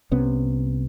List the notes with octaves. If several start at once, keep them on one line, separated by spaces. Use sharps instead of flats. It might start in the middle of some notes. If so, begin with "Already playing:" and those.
C2 C3 B3 C#4